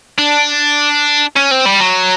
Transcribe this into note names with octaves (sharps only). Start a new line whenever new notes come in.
D4
C#4
C4
G3
F#3